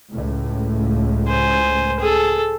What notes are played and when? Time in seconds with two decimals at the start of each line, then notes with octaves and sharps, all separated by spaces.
0.12 C#2 A2
1.28 C5 G#5
2.00 G#4 A4